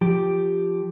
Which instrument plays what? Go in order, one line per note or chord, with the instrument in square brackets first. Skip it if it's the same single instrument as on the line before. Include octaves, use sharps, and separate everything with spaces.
[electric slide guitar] F3 G4